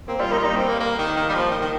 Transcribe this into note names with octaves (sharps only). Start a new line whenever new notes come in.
A#3 C4
G3 F4
A#3 D#4
F4
G3 D#4
C4
A#3
A#3
D#3
D#3 A#3
G3
F3
D#3
D#3